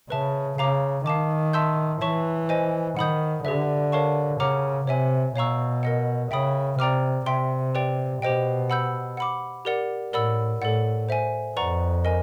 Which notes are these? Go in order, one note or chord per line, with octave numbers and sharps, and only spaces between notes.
C#3 B4 E5 A5
C#3 F5 A#5 D6
D#3 F5 A5 D6
E5 A5 C6 E6 G6
E3 C#5 E5 A5 C#6
C5 D#5 G#5
D#3 F#5 B5 D#6 G6
D3 G4 B4 E5
A#4 C#5 F5 A5 C#6
C#3 C#5 F#5 A#5 D6 F6
C3 C#5 E5 G#5
B2 C#5 F5 A#5 C#6 E6
A#4 D#5 F#5
C#3 E5 G5 B5 D#6
C3 D5 G5 A#5 D6 F6
C3 E5 G5 C6
G4 B4 D5 G5
B2 G4 C5 D#5 G5
F#5 B5 E6 G6
F#5 B5 D6
G4 A#4 D5 F#5
A2 A#4 D5 F#5 B5 E6
A2 A4 D5 F#5
C5 E5 G#5
F2 B4 D5 F#5 A#5 C#6
A#4 D#5 G#5